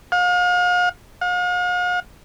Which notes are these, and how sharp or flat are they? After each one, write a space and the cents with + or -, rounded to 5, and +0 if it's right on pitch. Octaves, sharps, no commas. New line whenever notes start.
F5 +40
F5 +45